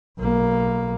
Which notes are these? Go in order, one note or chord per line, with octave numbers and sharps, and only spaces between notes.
B1 A#3